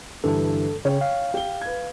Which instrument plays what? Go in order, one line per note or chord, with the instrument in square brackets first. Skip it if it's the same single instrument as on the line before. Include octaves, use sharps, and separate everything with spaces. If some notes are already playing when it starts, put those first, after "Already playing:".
[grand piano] G2 D3 E3 [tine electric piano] A4
[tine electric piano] C#3 [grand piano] C#5 G5
[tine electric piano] F5
[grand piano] G4 G7
B4 G#6